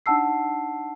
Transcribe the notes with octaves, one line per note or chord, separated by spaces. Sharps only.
D4 D#4 F#5 A5 E6 C7